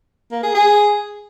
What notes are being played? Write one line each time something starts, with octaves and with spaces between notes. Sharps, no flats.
A#3
G#4
G#4